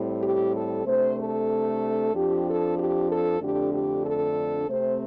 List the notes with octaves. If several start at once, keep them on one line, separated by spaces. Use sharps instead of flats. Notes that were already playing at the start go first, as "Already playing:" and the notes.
Already playing: A2 G3 C4
G4
A4
C3 A3 D4 C5
A4
F2 F3 D4 G4
A4
G4
A4
F2 D3 A3 D4 G4
G4
A4
C3 A3 C4 C5